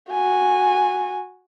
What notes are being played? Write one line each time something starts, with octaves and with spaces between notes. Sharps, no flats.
F#4 G#5